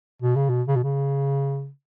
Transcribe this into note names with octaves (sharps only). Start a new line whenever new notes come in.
B2
C#3
B2
C#3
B2
C#3